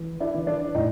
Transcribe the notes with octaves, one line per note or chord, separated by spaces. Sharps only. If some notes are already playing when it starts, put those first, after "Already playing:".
Already playing: E3
D4 E4
E3
D4
A2 D#4